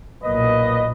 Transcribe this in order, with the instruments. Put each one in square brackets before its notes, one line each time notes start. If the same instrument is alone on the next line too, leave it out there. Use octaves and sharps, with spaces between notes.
[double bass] B1 A#2 [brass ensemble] A#3 B4 D#5